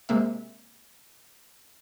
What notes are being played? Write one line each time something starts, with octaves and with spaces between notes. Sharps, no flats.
C3 G#3 A#3 E5